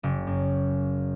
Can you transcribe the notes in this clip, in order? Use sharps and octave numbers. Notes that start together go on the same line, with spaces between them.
F#1
F#2